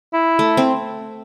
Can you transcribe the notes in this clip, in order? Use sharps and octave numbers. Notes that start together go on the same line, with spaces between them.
E4
A3
C4